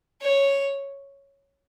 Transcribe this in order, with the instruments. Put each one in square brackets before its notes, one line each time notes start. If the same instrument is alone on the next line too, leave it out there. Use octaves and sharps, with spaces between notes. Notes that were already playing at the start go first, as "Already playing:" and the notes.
[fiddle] C#5